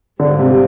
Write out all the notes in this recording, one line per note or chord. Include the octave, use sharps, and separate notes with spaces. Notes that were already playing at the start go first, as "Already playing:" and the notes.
G#2 D3 G3 C4 F4
C3